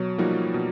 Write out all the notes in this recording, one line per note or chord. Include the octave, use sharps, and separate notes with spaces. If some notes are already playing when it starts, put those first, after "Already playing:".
Already playing: B2 F#3
F3 G3 A#3 D#4 F#4
B2